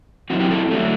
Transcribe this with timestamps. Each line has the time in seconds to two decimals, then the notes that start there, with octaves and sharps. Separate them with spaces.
0.30 F#2 F#3 C4 E4 F#4
0.40 G4
0.50 A4
0.71 D3 F#3 A3